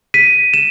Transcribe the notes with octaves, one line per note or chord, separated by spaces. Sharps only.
B6 D#7
E7